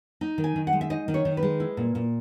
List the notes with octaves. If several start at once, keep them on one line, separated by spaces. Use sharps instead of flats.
D#4
D#3
G#5
D#3
F#5
G#3
E5
D#4 D#5
D#3
C#5
D#3
B4
G#3
E4
A#2
A#2